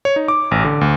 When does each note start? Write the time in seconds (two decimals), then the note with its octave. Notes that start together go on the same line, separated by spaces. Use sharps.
0.05 C#5
0.16 D#4
0.28 D6
0.51 A1
0.65 D3
0.81 D2